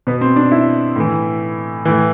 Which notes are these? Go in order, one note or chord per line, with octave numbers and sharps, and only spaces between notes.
B2 B3
C4
D4
E4
A2 E3
A2 E3